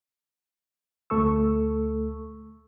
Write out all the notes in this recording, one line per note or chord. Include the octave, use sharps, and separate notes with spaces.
D2 A3 A4 C#6 E6